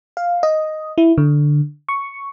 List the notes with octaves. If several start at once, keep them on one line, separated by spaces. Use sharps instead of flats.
F5
D#5
E4
D3
C#6